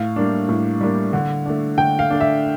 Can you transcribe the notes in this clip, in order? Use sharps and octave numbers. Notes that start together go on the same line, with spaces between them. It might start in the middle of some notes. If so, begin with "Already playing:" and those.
Already playing: A2 F5
G3 A#3 D4
A2
G3 A#3 D4
D3
A3 D4
D3 G5
F5
A3 D4
E5